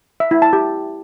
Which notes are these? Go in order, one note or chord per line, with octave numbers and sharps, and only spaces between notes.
E5
E4
A5
G4